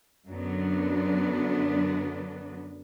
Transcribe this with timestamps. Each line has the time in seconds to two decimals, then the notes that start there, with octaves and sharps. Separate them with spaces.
0.29 F#2 D3 F#3 B3 D4